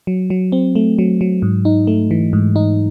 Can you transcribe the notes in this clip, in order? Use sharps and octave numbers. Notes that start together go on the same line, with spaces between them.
F#3
F#3
C4
A3
F#3
F#3
G#2
D#4
A3
E3
G#2
D#4